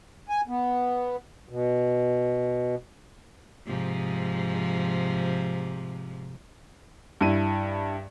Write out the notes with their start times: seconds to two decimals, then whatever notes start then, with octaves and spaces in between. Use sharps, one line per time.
0.29 G#5
0.48 B3
1.49 B2
3.67 G#2 C3 F3
7.21 G2 E4 D#7